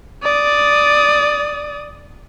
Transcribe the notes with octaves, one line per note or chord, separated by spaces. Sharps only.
D5 D#6